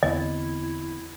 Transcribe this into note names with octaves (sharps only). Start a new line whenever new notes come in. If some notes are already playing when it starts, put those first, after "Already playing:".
E2 D3 B3 C4 E4 D#5